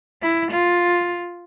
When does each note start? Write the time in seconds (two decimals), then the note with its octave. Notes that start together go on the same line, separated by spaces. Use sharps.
0.22 E4
0.51 F4